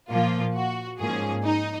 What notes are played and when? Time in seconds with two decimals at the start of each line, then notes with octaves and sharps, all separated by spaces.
0.10 A#2 F3 A#3 F4
0.55 F#4
0.99 G#2 F3 A#3 C#4 G#4
1.44 D#4